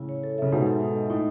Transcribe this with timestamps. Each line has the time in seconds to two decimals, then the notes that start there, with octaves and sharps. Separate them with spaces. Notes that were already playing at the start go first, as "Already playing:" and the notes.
Already playing: A2 C#3 E4
0.09 C#5
0.23 A4
0.38 C#3 E5
0.52 G#2 B2 G#3
0.67 A4
0.81 D#4
0.95 D#5
1.10 A2 D#4